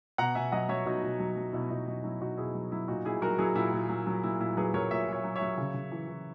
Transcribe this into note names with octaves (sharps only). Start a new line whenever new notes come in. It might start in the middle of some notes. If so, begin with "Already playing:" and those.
B2 F#5 A#5
B2 E5 G#5
F#3 D#5 F#5
F#3 C#5 E5
B2 D#4 F#4
B2
F#3
F#3
B2 E4
B2 D#4
F#3 D#4
F#3 E4
B2 D#4 F#4
B2 E4 G#4
F#3
F#3 E4
A#2 D#4 F#4
A#2 E4 G#4
F#3 F#4 A#4
F#3 E4 G#4
A#2 E4
A#2
F#3
F#3
A#2 E4
A#2 E4
F#3 G#4 B4
F#3 A#4 C#5
A#2 C#5 E5
A#2
C#5 E5
F#3
C#5 E5
F#3
C#3
C#3
E3
E3